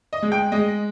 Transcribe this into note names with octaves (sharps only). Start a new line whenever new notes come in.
D#5
G#3
G5
G#3 D#5